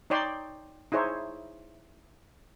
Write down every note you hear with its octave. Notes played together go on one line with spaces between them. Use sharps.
D#4 C#5 D5 G5 C6
D#4 E4 G#4 C5 C#5